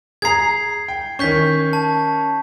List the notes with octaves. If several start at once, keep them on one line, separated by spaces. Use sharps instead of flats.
G#4 A#5 G#6 C7
G5
D#3 C#4 C#6 G6 B6
A5